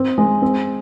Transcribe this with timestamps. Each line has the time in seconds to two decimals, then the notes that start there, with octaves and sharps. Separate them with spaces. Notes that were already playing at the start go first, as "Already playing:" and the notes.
Already playing: C4
0.18 G#3
0.42 C4